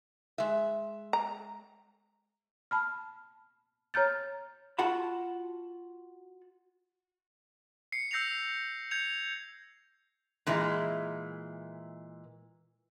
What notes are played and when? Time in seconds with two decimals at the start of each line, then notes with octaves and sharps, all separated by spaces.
0.38 G#3 E5
1.13 A#5
2.71 A5 B5 F6
3.94 C#5 A#5 F6 G6 A6
4.79 F4 F#4 F#5 A5 B5
7.92 C7 C#7
8.11 E6 G6 A#6 C7 C#7 F7
8.91 G6 G#6 C#7 F7
10.47 A#2 E3 G#3